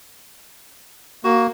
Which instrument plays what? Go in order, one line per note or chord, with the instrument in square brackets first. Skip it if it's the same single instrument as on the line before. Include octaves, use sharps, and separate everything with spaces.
[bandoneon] A#3 [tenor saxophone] F#4